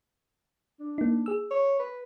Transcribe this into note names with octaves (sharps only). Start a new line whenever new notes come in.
D4
A#3 D#4
G#4 E6
C#5
B4